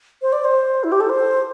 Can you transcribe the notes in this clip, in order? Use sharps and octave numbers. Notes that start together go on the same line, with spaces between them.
C5
D5
C5
E4
G4
A4
C5